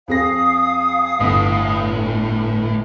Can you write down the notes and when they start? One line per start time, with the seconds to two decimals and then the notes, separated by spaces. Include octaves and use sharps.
0.08 F2 G#4 F5 D#6 A#6
1.20 G1 A2 F#5